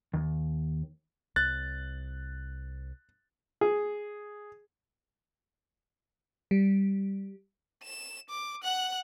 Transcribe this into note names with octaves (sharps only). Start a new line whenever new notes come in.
D#2
C2 F#6 A6
G#4
G3
E7
D6
F#5 F#6